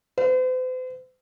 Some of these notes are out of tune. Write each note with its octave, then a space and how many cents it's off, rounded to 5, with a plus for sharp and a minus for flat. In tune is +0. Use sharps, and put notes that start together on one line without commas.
C5 -45